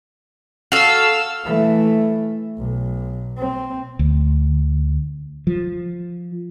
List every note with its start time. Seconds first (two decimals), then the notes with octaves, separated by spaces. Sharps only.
0.72 F#4 A4 F5 E6
1.44 E3 A3
2.58 B1
3.38 C4
3.99 D2
5.47 F3